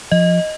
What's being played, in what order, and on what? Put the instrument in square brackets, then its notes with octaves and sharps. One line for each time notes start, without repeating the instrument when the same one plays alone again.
[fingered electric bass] F3 [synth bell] D#5